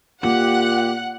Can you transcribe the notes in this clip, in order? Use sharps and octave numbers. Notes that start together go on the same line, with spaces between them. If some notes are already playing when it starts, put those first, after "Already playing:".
A#2 A#3 G4 F#5 F#6